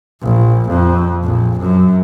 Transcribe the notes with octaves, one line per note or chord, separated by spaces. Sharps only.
A#1
F2
A#1
F#2